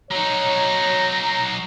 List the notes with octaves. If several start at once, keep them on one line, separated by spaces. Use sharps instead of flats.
F#3 D#4 C#5 A#5